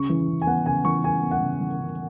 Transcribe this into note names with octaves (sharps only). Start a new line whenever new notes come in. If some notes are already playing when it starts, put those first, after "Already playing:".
Already playing: C#3 C#6
E3
C#3
G#5
B3 F#5
C#3 G#5
E3 C#6
C#3 G#5
B3
F#5
C#3
E3
C#3